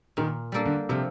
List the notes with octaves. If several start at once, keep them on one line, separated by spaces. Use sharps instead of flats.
A#2 D#3
G3 A#3 D4 A4
D3
C3 F3